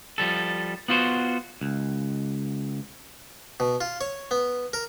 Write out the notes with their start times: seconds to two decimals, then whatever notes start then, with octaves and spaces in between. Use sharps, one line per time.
0.18 F3 G3 A4
0.88 B3 F4 F#4 C5
1.61 C#2
3.60 B2
3.81 F4
4.01 C#5
4.31 B3
4.73 A#4